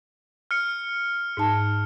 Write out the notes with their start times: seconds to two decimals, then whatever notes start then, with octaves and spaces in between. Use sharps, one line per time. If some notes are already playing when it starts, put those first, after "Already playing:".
0.51 F6 C#7
1.37 G#2 D#4 A5